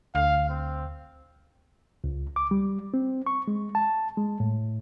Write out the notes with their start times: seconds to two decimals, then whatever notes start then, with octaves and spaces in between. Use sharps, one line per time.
0.15 D2 F5
0.49 C4
2.04 C#2
2.36 D6
2.51 G3
2.94 C4
3.27 C#6
3.48 G#3
3.75 A5
4.17 G#3
4.40 A2